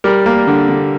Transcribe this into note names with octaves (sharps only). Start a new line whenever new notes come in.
G3 A#4 D5
A#3
D3
D3